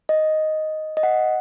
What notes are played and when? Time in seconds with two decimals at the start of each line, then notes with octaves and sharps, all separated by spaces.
0.09 D#5
0.97 D#5
1.03 F#5